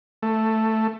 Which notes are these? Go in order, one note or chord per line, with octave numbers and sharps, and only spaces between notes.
A3